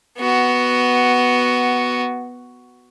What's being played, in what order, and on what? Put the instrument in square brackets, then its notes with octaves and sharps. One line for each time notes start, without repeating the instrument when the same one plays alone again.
[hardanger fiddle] B3 F#4